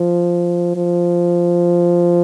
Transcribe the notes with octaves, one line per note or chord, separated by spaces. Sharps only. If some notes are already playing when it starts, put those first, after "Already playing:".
Already playing: F3
F3